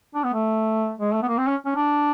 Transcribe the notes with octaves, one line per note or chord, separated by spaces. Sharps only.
D4
B3
A3
G#3
A3
B3
A#3
C4
C#4
C#4
D4